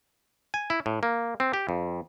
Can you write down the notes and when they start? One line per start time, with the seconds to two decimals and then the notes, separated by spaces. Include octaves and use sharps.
0.54 G#5
0.70 E4
0.86 A2
1.03 A#3
1.40 C4
1.53 G4
1.69 F2